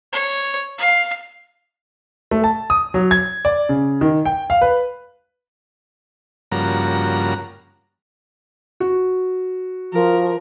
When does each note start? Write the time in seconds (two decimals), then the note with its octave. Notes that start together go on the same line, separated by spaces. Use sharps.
0.12 C#5
0.78 F5
2.31 A3
2.44 A5
2.70 D#6
2.94 F#3
3.11 G#6
3.45 D5
3.69 C#3
4.01 D#3
4.25 G5
4.50 F5
4.61 B4
6.52 G2 C#3 F3 A#3 F#4 A#5
8.80 F#4
9.93 F3 A#4